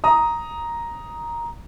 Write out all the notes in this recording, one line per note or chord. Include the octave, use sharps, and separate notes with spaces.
A#5 D#6